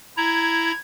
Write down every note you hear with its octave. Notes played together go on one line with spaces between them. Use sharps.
E4 A#5 G#6